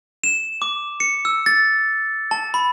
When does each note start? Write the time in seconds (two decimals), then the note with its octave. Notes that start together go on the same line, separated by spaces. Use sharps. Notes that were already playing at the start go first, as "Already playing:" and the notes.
0.24 E7
0.62 D6
1.00 C#7
1.25 E6
1.46 A6
2.31 A5
2.54 B5